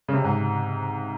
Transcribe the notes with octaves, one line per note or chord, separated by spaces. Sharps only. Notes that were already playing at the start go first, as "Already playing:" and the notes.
C#3
C3
G#2